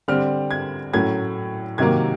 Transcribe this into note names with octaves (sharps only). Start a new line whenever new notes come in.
D3 G3 C4 F6
G#6
A2 F#3 A3 C#4 G#6
C3 D#3 F#3 A#3 G#6